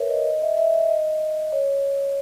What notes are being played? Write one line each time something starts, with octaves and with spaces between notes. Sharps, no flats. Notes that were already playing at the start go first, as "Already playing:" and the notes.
Already playing: A#4 B4 C#5 E5
D#5
D#5
E5
E5
E5
D#5
C#5